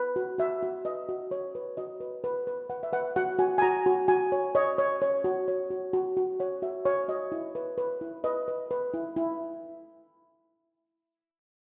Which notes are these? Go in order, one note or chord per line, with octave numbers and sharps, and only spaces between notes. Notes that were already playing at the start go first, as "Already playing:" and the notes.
Already playing: B4
F#4
F#4 E5
F#4
B4 D#5
F#4
F#4 C#5
B4
F#4 D#5
B4
B4
B4
B4 F#5
E5
B4 F#5
F#4 F#5
F#4 G#5
G#5
F#4 A#5
F#4
F#4 G#5
C#5
C#5 D#5
C#5
C#5
F#4
C#5
F#4
F#4
F#4
C#5 F#5
F#4 E5
F#4 C#5
F#4 D#5
E4
B4
B4
E4
B4 D#5
B4
B4
E4
E4